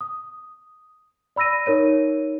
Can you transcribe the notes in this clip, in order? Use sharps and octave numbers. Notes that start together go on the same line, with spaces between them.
D#6
D5 B5 E6 A#6 D#7
D#4 A#4 C#5 D#7